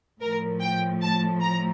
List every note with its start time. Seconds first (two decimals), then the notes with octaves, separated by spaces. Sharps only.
0.20 A2 F3 A#4
0.61 G5
1.01 A5
1.41 A#5